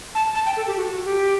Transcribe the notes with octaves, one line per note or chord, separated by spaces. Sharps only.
A5
A5
G5
A4
G4
F#4
F#4
G4